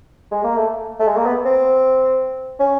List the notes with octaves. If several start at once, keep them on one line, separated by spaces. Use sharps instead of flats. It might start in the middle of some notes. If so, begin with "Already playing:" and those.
G#3
A#3
A3
A3
G#3
A#3
B3
C4
C#4